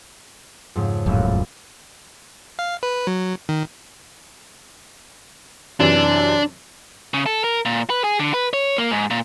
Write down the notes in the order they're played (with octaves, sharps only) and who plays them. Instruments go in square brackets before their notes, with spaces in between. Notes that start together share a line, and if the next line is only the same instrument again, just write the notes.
[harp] F2 G#2 C#3
[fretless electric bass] D1 F#2 [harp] A#1 A2
[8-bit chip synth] F5
B4
F#3
D#3
[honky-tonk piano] F#2 C3 E3 [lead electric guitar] D4
[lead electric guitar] C#3
A4
A#4
A#2
B4
G#4
D3
B4
C#5
A#3
G#2
A#2